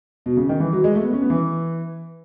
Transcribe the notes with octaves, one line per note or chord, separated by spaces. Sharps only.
B2
C#3
D#3
E3
F#3
G#3
A3
B3
C#4
B3
E3